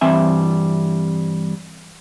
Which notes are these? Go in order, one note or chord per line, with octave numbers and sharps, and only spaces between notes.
G2 E3 G3 C4 E5 G#5